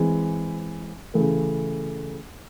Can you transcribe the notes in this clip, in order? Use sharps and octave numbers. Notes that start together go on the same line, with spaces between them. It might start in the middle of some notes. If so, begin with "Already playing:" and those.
Already playing: E3 G#3 C4
C#3 E3 A3